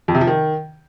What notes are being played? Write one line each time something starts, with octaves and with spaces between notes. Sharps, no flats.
F2
C3
F3
D#3